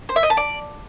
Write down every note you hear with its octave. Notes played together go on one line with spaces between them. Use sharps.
C5
E5
D#5
A5
D5